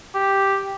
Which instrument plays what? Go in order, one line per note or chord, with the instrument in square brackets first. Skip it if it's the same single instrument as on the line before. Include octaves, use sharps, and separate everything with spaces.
[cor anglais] G4